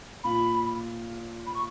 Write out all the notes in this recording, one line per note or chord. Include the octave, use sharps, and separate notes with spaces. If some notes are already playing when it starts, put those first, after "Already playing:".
A#2 B5
B5
C#6